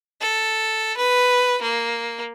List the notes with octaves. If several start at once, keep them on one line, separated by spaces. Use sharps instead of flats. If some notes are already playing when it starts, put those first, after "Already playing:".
A4
B4
A#3